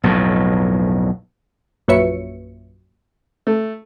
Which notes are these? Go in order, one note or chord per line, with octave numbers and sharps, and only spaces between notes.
B1 F2 A2
A#1 F#2 B4 C#5 E5 C#7
A3